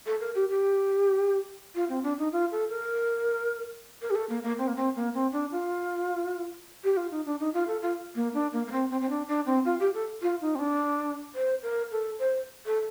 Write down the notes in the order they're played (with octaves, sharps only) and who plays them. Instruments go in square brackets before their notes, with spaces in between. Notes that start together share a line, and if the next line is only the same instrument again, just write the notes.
[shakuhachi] A4
A#4
G4
G4
F4
C4
D4
D#4
F4
A4
A#4
A#4
G4
A4
A#3
A#3
C4
A#3
C4
A#3
C4
D4
F4
G4
F4
D#4
D4
D#4
F4
A4
F4
A#3
D4
A#3
A#3
C4
C4
C4
D4
D4
C4
F4
G4
A4
F4
D#4
C4
D4
C5
A#4
A4
C5
A4